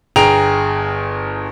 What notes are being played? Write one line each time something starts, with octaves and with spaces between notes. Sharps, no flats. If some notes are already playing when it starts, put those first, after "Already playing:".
G1 G#4 G5 A#5 D7 F7